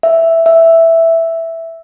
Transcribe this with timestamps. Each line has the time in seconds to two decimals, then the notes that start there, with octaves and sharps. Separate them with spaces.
0.03 E5
0.46 E5